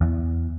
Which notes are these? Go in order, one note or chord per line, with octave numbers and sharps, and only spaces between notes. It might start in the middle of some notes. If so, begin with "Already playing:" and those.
E2